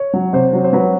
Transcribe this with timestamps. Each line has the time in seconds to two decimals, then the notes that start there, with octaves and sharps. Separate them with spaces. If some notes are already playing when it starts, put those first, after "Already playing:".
Already playing: C#5
0.13 F#3
0.33 C3 C5
0.53 F#3
0.64 C5
0.73 F#3 B4